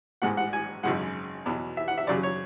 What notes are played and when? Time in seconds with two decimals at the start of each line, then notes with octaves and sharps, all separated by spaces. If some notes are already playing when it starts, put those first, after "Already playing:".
0.22 A1 G#2 G#3 F#5
0.37 F#5
0.53 G#5
0.83 G#1 F#2 C#3 G#3 F#5
1.46 E2 B2 F#3
1.77 E5
1.88 F#5
1.98 E5
2.07 F#2 C#3 F#3 D5
2.23 C#5